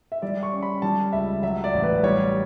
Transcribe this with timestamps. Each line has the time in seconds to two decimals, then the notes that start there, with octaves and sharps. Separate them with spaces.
0.12 E5
0.22 G3 D5
0.43 C#6
0.53 C#4
0.63 B5
0.82 G3 A5
1.13 C#2 E5
1.43 F#3 E5
1.64 D5
1.74 A1
1.83 B4
2.03 G3 C#5